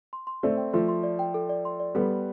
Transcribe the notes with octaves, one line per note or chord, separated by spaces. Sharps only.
C6
C6
A3 C4 D5
G5
F3 A3 C6
C6
D5
G5
A4
D5
C6
D5
G3 B3 A4
A4